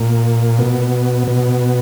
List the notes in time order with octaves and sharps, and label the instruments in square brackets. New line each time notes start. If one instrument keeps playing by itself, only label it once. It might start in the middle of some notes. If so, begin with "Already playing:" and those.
Already playing: [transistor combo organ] A#2
B2
B2